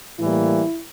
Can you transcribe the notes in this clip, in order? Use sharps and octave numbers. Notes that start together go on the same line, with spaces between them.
A2 E3 G3 A#3 E4